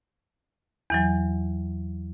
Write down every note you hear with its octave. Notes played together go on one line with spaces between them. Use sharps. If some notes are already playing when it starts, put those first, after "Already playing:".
E2 E3 F#3